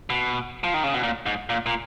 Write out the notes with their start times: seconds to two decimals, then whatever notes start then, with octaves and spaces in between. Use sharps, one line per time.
0.10 B2
0.64 F3
0.74 D#3
0.84 C#3
0.94 B2
1.03 A#2
1.26 G#2
1.49 A#2
1.66 A#2